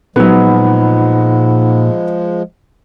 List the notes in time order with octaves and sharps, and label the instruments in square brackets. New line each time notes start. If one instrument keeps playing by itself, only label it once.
[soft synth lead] A#2 [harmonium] F3 G#3 [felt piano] F#3 B3 [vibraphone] D#4 F#5 B5